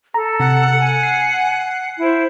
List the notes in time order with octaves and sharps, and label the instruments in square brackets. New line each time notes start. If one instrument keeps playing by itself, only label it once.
[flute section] A4 [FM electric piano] A#5
[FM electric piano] C3 [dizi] F#5
[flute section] G#5
[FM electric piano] C7
[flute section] E4 C5